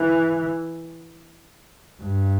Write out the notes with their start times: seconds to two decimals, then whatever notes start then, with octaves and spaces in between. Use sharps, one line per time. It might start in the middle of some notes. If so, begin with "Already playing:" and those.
Already playing: E3
2.02 G2